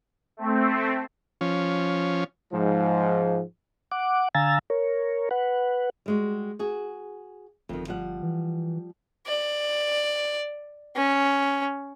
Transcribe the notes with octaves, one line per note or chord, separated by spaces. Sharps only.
A3 C4
F3 C#4
G#2 F3
F#5 D6
D3 F5 G#5 A#5 E6 A6
A#4 C#5
B4 F#5
G3 G#3 F#4
F#4 G#4
G1 F2 D#3
F3 G3 F#5
E3
D5
C#4